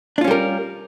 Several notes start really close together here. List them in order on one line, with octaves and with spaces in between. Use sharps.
D4 F4 C#4 G3 A#4